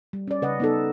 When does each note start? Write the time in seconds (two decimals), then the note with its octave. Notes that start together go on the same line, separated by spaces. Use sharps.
0.13 G3
0.28 C#4 D5
0.42 C#3 B4 D#5 F#5
0.60 B3 D#4 A4